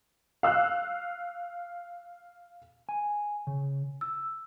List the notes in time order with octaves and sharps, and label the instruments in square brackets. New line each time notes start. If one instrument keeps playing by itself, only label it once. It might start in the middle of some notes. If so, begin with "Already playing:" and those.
[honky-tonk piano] F5 E6 F#6
[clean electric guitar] G#5
C#3
[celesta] E6